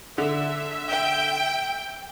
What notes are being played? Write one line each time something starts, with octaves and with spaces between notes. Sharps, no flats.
D3 E5
G5